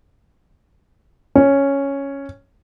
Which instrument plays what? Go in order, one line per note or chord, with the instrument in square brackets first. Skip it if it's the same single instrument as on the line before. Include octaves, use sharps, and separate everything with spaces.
[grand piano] C#4